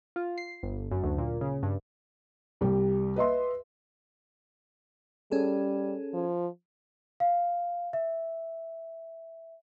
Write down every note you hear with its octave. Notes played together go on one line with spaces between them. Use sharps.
F4
C7
G1
F#2
D2
A#2
C#3
G2
C2 G3 G4
B4 D#5 E5 C6
G3 C#4 G#4 A4
F3
F5
E5